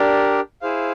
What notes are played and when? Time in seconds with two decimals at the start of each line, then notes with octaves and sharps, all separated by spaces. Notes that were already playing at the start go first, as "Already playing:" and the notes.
Already playing: D4 G4 A#4 D5
0.62 E4 G#4 C5 F5